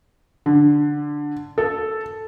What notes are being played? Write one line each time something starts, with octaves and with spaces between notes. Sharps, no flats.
D3
A4